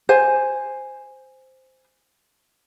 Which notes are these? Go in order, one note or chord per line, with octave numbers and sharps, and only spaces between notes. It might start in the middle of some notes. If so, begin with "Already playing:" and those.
C5 G#5